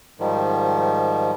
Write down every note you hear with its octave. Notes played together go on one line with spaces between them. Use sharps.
G#2 D#3 F3 G3